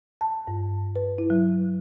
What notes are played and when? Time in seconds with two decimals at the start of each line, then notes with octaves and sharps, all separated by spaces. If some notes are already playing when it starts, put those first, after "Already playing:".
0.21 A5
0.47 G2
0.96 B4
1.18 E4
1.30 F#3